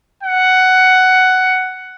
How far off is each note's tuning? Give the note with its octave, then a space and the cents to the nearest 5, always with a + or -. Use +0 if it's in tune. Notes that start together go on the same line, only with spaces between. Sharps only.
F#5 +10